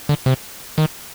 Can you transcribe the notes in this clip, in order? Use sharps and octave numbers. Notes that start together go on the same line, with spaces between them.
D3
C3
D#3